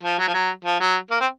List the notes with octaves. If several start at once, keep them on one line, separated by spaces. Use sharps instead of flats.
F3
F#3
F3
F#3
F3
F#3
A#3
C4